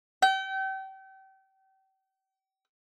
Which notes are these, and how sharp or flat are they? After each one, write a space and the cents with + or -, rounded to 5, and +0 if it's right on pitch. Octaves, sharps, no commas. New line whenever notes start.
G5 -35